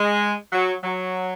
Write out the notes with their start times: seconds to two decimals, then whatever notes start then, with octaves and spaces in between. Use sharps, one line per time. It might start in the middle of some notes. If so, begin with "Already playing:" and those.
Already playing: G#3
0.53 F#3
0.84 F#3